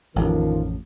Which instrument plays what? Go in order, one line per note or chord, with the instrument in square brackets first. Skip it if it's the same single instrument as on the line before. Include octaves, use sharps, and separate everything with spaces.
[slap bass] A1 F2 [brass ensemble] D#3 F3 A#4